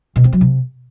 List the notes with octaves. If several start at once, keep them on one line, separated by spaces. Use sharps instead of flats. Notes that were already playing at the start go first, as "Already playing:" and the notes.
B2
C4
F#3
C3